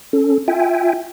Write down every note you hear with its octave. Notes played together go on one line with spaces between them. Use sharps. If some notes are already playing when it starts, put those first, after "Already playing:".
C#4 A4
F4 E5 G5 G#5